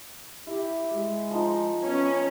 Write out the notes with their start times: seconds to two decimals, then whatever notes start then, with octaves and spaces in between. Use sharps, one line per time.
0.47 E4 G4
0.94 G#3
1.31 F3 D#4
1.83 B3 C#4